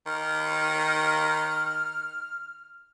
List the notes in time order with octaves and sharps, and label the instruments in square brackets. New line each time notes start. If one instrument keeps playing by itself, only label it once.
[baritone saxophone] D#3 [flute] F6